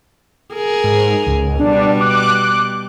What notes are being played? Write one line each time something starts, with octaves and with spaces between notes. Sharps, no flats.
G#4 A#4
G#2
C#2
B2 G3 D4
D6 F#6